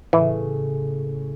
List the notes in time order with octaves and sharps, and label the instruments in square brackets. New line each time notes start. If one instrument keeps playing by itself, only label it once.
[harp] A2 C#3 [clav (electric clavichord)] E3